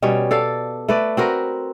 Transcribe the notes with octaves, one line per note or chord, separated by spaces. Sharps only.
B2 G3 C#4 C#5
A4 D5 F5
A3 B4 D5
C4 F#4 A#4 B4